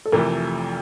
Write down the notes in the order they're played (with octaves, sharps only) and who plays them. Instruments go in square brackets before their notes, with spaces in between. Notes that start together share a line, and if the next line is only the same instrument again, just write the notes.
[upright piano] A4
[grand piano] F1 F2 C3 E3 A3 [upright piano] A#4